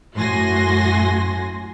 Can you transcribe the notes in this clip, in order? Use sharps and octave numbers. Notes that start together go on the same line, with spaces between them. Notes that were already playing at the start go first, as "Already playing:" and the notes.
F#2 A2 F#4 G#5 C6 A#6